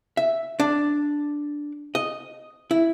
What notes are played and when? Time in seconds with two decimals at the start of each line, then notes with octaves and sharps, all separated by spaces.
0.17 E5
0.60 D4
1.95 D#5
2.71 E4